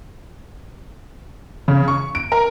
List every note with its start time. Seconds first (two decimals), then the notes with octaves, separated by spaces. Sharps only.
1.68 C#3
1.88 C#6
2.15 D7
2.32 A#4